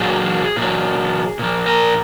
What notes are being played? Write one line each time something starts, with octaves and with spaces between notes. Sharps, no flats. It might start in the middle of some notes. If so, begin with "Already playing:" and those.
Already playing: A#2 F#3 G#4
A#2 F#3
A#2 F3
A#4